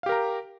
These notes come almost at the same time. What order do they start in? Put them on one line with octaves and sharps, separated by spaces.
F5 G4 A#4 A#5